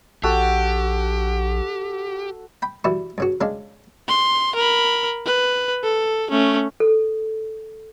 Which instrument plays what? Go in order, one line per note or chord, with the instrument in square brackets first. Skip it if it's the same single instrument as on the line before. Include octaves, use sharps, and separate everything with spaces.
[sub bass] A#1 [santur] F#4 A4 [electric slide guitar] G4
[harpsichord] G5 B5
E3 G3 E4 F#4
G2 C#3 F#4
C#3 G#3 D4 F5
[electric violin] C6
A#4 B5
B4
A4
A3 C#4
[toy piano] A4